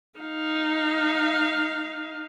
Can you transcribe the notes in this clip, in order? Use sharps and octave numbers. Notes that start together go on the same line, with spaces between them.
D#4 F5